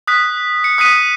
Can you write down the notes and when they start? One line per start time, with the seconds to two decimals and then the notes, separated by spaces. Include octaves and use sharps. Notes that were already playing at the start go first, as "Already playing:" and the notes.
0.07 D#6 F#6 B6
0.64 C#7
0.78 D#6 F#6 B6 D#7